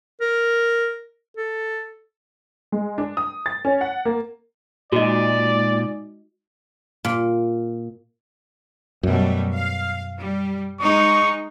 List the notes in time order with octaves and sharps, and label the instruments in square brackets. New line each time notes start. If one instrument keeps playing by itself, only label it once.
[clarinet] A#4
A4
[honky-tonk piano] G#3
D4
D#6
A6
C#4
F#5
A#3
[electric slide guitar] A#2 [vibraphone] G#3 D#4 [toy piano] F#4 D#5 [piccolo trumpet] D5
[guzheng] A#2
[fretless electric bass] F#2 B2 [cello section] F#3 G3 A3
[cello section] F5
G3
[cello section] G#3 D#4 [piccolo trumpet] C#6